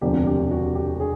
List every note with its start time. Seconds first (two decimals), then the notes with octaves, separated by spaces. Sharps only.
0.01 E1 D2 C3 F3 G4
0.27 G4
0.51 F#4
0.75 G4
1.00 G#4